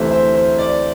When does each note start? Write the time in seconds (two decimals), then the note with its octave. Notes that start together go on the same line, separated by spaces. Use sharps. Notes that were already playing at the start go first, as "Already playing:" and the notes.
Already playing: D2 C3 E3 A3 C5 E5
0.11 C5 E5
0.35 C5
0.58 D5